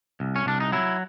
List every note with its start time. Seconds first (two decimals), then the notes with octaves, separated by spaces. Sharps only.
0.20 C2
0.36 C#4
0.46 C2 D4
0.60 D#4
0.72 F#3 E4